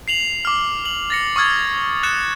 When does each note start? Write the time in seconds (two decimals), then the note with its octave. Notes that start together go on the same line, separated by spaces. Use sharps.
0.08 C7 F7 F#7
0.45 D6 F6
0.85 F#7
1.10 A6 A#6 C#7
1.36 C#6 D#6 F6 G#6 A6
2.03 F#6 A6 C#7 E7